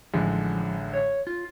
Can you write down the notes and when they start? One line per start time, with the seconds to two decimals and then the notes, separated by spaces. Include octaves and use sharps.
0.14 A1 D3 F3 G#3
0.93 C#5
1.27 F4